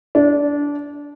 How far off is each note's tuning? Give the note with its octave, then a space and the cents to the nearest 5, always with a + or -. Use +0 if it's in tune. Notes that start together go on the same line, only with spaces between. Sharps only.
D4 -20